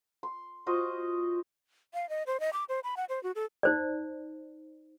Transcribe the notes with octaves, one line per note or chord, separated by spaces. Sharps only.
C6
F4 F#4 C5 D#5
F5
D#5
C5
D#5
D6
C5
B5
F#5
C5
F#4
A4
D#4 C5 D5